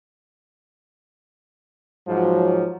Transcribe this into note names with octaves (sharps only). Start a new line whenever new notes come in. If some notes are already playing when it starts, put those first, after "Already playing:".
G#2 F3 F#3